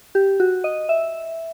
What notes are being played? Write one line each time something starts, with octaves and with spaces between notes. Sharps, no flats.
G4
F#4
D#5
E5